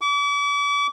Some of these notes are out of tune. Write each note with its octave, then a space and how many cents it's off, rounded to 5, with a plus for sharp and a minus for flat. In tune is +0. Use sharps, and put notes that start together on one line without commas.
D6 -40